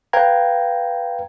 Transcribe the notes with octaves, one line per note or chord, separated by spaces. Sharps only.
B4 F5 G5 A#5 G#6